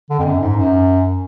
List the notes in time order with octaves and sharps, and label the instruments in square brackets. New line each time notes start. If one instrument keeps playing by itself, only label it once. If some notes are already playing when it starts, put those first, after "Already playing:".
[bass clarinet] D3
F2
F#2
G#2
F#2